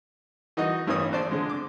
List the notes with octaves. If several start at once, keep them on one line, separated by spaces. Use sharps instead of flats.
E3 D#4 F#4 D#5
A1 G2 E3 C#4 D#6
A#1 C5 D5 A5
D3 G#3
D6